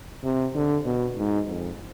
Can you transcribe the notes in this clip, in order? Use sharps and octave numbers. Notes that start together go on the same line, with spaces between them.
C3
D3
B2
G#2
F2